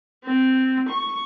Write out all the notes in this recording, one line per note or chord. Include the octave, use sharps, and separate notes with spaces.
C4
C#6